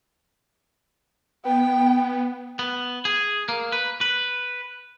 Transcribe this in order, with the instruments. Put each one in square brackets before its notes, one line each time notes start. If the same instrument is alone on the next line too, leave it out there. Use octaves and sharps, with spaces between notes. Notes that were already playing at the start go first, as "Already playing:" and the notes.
[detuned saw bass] B3 [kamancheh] G5
[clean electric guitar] B3
G#4
A#3
B4
B4